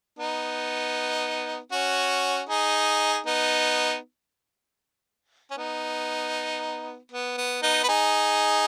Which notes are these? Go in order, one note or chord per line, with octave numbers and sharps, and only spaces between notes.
B3 D#4
C#4 F#4
D#4 G#4
B3 D#4
C#4
B3 D#4
B3
B3
B3 D#4
B4
D#4 G#4